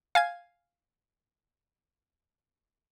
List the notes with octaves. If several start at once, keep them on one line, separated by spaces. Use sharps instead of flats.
F5 G#5 G#6